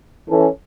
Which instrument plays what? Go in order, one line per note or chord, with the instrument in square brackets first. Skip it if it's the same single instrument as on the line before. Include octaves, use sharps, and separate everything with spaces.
[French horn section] E3 C#4 A4